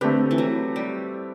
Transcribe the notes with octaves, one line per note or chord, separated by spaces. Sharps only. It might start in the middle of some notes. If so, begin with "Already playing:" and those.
D3 A3 C4 G4 B4
E3
F#3
G3